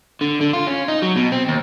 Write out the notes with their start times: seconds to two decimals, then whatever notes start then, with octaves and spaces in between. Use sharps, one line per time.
0.21 D3
0.41 D3
0.53 F4
0.67 C#4
0.88 D#4
1.02 F#3
1.16 B2
1.32 C4
1.48 D#2